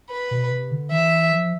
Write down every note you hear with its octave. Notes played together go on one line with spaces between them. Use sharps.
B4
B2
C3
D3
E3 E5
F3